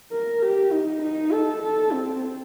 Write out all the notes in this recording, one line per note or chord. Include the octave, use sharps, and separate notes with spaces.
A#4
G4
D#4
D#4
A4
A4
C4